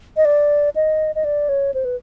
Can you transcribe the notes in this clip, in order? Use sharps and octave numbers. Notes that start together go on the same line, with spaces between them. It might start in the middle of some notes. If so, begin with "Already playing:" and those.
D#5
D5
D#5
D#5
D5
C#5
C5
B4